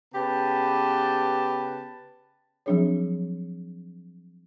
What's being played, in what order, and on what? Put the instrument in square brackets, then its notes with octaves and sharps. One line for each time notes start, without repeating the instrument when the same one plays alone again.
[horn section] C#3 B3 G4 B4 A5
[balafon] F3 F#3 C4 D4 G#4 C#5